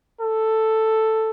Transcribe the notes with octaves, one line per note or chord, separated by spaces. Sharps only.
A4